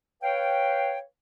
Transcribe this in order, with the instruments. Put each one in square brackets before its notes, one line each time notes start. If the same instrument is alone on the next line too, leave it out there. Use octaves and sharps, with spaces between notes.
[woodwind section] B4 C#5 F5 G5